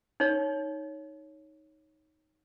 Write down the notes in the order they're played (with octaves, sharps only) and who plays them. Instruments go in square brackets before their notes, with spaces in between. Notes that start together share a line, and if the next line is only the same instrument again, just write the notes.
[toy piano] D#4 C#5